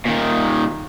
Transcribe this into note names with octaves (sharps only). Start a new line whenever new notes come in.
A#2 D#3